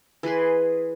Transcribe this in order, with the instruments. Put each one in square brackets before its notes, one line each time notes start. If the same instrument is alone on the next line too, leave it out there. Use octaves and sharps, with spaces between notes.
[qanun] E3 G#4 B4 C6